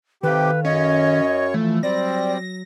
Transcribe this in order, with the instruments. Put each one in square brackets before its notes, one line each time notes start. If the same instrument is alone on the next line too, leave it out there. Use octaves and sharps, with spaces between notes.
[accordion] C3 G4 [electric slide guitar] D#3 A4 F5 [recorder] B4
[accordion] F#2 C#5 [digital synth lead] C#4 [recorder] D#5
[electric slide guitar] E3 F3 [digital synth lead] A3
[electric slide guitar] F#3 [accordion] G3 C4 [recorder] D5 [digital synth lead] A#6